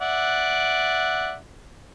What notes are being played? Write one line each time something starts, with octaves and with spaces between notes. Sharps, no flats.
D5 E5 F#5